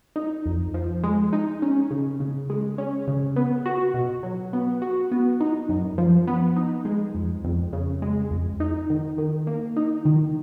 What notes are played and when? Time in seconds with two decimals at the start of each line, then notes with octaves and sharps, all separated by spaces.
0.16 D#4
0.46 F2
0.74 F3
1.04 G#3
1.33 D#4
1.62 C#4
1.91 C#3
2.20 C#3
2.50 G#3
2.78 C#4
3.07 C#3
3.36 B3
3.66 F#4
3.94 B2
4.23 F#3
4.53 B3
4.82 F#4
5.12 B3
5.40 D#4
5.69 F#2
5.98 F3
6.27 B3
6.56 D#4
6.85 G#3
7.15 F2
7.44 F2
7.73 C#3
8.02 G#3
8.31 F2
8.60 D#4
8.90 D#3
9.18 D#3
9.47 A#3
9.76 D#4
10.05 D#3